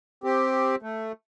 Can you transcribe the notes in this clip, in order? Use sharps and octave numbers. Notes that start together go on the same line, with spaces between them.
C4 G4
A3